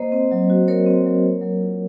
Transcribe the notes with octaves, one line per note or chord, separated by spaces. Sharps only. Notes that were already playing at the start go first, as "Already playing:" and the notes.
Already playing: A#3 C5 D#5
C4
F#3
F#4
F#3 A#4 C#5
C4
F#3
A#3
F#3
F4